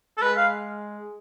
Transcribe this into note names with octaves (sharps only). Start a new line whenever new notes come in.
A4
G#3 B4
F5